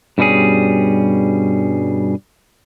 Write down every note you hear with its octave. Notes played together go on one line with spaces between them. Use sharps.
G2 B2 G3 C#4 G#4